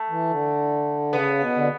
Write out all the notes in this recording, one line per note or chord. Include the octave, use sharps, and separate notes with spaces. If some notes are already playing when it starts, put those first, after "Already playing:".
Already playing: A3
E3
D3
C#3 B3
B2
D3